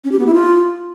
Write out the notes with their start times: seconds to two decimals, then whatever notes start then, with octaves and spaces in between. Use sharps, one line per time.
0.04 C#4
0.12 G4
0.19 B3
0.27 E4
0.34 F4